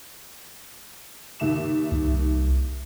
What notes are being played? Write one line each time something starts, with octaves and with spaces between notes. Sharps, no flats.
D#2 E5 E7
C2